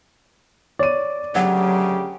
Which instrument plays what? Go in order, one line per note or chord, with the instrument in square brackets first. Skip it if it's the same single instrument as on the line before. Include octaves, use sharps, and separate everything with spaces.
[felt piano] C#5 D#7 [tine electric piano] D5
[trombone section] D2 C#3 G4 [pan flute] F#3 [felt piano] F#5